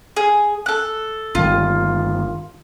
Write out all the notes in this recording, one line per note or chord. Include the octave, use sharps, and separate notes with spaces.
G#4
A4 F#6
G1 D#3 F4